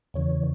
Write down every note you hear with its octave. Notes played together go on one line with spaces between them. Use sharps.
E2 C#3 E3 C#5